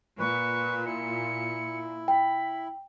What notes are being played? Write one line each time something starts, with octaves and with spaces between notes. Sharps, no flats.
A#2 B4 C#6
E4 C#7
G5 B5